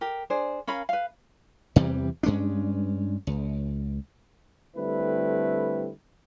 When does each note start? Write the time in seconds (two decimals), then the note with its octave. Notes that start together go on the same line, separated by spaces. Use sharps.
0.01 G4 A#4
0.30 D4 G#4 C5
0.67 C#4 A#4 F5 B5
0.89 B4 F5
1.76 E2 C3 E3 G3
2.23 G2 G#3 C#4 D4
3.27 C#2
4.76 D3 G3 A3 C4 E4 B4